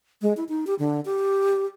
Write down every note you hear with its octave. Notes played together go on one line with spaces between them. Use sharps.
G#3
E4
D#4
G4
D3
G4